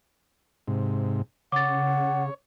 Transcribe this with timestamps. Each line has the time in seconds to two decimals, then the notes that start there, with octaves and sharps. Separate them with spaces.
0.68 G#2 C3
1.52 C#3 C#5 F#5 D6 A6